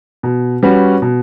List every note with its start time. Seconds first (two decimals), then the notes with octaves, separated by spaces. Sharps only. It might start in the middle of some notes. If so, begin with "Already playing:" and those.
0.23 B2
0.63 G3 C#4 F#4 B4
1.02 B2